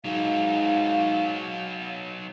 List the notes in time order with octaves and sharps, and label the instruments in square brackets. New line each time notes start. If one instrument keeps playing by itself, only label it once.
[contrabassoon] G#2 [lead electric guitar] F#3 D#4 [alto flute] F5